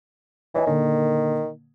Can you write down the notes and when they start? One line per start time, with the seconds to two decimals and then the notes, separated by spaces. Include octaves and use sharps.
0.55 E3 C#5 D#5 G#5
0.67 A#2 D3 D#3 A#3